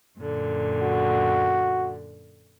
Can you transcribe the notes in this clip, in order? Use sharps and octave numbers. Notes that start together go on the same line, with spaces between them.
F#2 A#2 D3
F#4